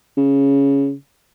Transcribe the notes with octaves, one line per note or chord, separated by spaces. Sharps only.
C#3